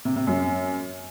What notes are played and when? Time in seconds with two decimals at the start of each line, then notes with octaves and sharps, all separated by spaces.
0.05 C3
0.16 C3
0.27 F#2